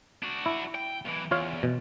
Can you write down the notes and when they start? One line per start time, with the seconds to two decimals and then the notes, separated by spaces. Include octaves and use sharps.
0.23 D4 F#4
0.46 E4
0.75 G5
1.05 B1 E3
1.31 E2 F4 C#5 F5
1.63 B2